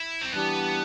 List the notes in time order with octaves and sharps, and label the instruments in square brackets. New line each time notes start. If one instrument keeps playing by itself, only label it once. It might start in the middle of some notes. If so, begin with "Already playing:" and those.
Already playing: [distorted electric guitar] E4
C4
[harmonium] E3 G3 D4 G4 [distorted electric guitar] B3